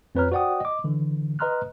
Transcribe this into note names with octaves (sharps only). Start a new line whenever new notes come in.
F2 C4 B4 C#5 A#5 F6
F#4 C5 D5 F#5 G5 D#6
D#5 D6
D3 E3
B4 D#5 A#5 C6 F6 F#6